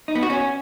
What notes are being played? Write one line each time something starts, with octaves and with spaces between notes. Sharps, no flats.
D#4
B3
F#4
C#4